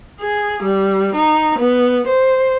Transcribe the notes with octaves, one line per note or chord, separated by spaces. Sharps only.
G#4
G3
D#4
B3
C5